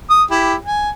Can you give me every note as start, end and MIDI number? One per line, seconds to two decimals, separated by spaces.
0.10 0.23 87
0.31 0.55 64
0.31 0.55 67
0.65 0.90 80